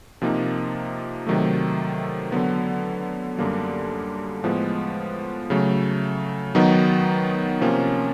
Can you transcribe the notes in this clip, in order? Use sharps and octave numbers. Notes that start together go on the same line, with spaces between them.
C3 F3 A#3 D#4
C3 D#3 F#3 A3
D3 F#3 B3
F#2 D3 G3 A#3
A2 F3 G#3 B3
C#3 F#3 A3
D#3 F#3 B3 D#4
C3 F3 A#3 C#4